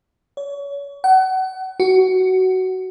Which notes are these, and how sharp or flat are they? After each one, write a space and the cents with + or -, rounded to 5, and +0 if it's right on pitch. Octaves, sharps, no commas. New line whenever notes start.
C#5 +30
F#5 +30
F#4 +15